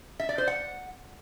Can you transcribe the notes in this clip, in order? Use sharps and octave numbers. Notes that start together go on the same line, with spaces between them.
E5
D5
C5
F#5